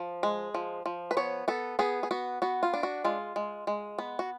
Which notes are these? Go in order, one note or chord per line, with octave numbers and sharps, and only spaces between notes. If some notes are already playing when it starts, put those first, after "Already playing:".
Already playing: F3
G#3
F3
F3
B4
B3 C#5
B3 A4
B3 G#4
G#4
B3 F#4
B3 F#4
F4
D4
F#4
G#3 F4
G#3
G#3
B3
F#4